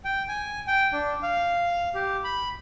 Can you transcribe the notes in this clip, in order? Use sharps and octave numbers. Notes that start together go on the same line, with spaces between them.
G5
G#5
G5
D4
F5
G4
B5